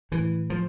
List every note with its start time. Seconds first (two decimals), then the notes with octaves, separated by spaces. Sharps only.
0.11 A2 E3
0.50 F3